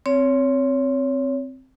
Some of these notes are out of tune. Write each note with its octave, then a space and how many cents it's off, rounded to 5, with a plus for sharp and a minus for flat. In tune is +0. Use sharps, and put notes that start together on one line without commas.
C4 +0 C#5 +20